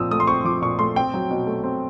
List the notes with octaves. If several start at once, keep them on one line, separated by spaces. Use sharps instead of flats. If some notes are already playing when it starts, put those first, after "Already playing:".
Already playing: A#2 F3 C4 D#6 E6
A3 D#6
C6
C4 C#6
F3 D6
A#2 C#6
A3 C6
C4 G5
F#3
B2
A3
C4